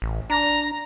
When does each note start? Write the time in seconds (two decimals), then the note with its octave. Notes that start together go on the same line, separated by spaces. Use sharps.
0.02 A1
0.30 D4 A#5